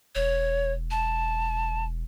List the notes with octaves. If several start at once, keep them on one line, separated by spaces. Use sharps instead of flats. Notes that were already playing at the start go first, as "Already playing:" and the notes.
E1 C#5
A5